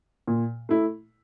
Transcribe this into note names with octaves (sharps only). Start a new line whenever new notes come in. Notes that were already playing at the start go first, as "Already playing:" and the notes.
A#2
A3 E4